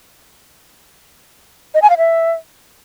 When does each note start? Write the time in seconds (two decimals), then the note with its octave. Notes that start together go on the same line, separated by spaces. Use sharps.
1.74 D#5
1.82 G#5
1.90 F5
1.98 E5